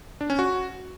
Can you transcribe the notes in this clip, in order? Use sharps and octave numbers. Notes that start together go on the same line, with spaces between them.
D4
C#4
F#4